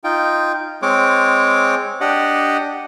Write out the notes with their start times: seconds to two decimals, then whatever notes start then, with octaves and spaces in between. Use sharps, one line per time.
0.04 D#4 F4 G5
0.82 G#3 C4 C#5 D6
2.01 D4 G4 D#5 F#5